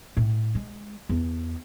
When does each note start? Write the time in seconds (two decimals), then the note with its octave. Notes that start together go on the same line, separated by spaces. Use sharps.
0.17 A2
0.55 G#3
1.09 E2